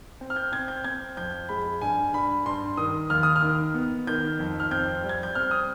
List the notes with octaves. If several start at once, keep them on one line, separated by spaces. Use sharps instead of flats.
C4
F6
G6
C4 G#6
G6
C4 G#6
F2 G6
G#3 B5
G2 G#5
G2 B5
G2 C6
D#3 D#6
D#2 F6
D#6
F6
D#3
B3
D#3 G6
F2
F6
C4 G6
G3
G#6
G6
C4 F6
D#6